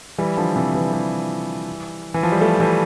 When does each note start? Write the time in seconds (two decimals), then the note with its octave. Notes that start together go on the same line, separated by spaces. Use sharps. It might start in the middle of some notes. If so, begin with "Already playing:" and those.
0.18 E3 G3
0.37 D3 F3
0.56 C3 E3
0.74 E3 G3
0.93 E3 G3
2.14 E3
2.23 F3
2.32 G3
2.41 F3 A3
2.60 E3 G3